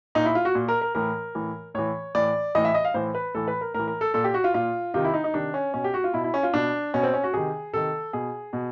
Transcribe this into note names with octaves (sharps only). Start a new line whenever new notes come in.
A#2 D#4
E4
F4
F#4
A#2
A#4
A#4
A2 E3 A#4
A2 E3
A2 E3 C#5
A2 E3 D5
A2 E3 D#5
E5
D#5
F5
A2 E3 C5
B4
A2 E3 A4
B4
A#4
A2 E3 A#4
A#4
A4
A#2 A4
G4
F#4
F4
A#2 F4
C3 D#3 F4
E4
D#4
D#4
C3 D#3 D4
C#4
B2 C#4
G4
F#4
F4
B2 E4
E4
C#4
F4
B2 D4
B2 C#4
C4
C#4
F#4
C3 D#3 G#4
C3 D#3 A4
B2 G#4
B2